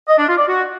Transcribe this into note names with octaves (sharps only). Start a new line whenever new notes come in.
D#5
D4
F4
D5
F#4